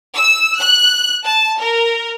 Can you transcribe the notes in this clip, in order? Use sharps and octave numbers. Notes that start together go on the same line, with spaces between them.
E6
F#6
A5
A#4